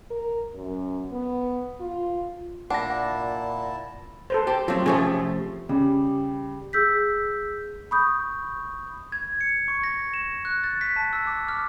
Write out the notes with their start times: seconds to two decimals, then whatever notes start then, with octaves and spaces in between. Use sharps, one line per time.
0.10 A#4
0.55 F#2
1.12 B3
1.80 F4
2.70 A#2 D4 E4 F#5 A5 A#6
4.30 A4 B4 C5
4.47 G4 C5 A5
4.68 F#3 A3 C4 F4
4.86 C3 F3 A3 C#4 G#4 C#5
5.69 C#3 G3
6.73 G#4 E6 G6 B6
7.91 B5 C#6 D#6 G6
9.12 G#6
9.41 C#7
9.68 C#6
9.84 A#6
10.14 E7
10.45 F#6
10.64 A6
10.81 B6
10.96 A5
11.13 E6
11.27 D6
11.49 F6